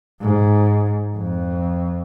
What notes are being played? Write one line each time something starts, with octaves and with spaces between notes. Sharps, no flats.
G#2
F2